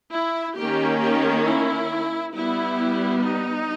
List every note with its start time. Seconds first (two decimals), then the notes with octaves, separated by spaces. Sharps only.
0.13 E4
0.57 D#3 A#3 C#4 G4
1.02 G4
1.45 E4
2.33 G3 B3 E4
3.22 D#4